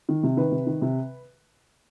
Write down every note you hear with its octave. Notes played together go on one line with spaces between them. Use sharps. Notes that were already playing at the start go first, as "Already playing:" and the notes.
D#3
C3
D#3 B4
C3
D#3
C3